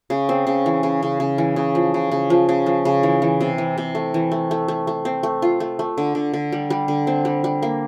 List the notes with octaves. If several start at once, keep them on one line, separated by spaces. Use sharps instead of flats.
C#3
C4
C#3
E3
C#3
C#3
C#3
E3
C#3
F3
C#3
C#3
F3
C#3
F3
C#3
E3
E3
C3
E3
C3
A3
E3
A3
A3
A3
A3
C4
A3
F4
A3
A3
D3
D3
D3
G3
G3
D3
C4
G3
G3
A#3